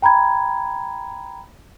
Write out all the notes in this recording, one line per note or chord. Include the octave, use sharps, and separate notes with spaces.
G5 A#5 B5 G#6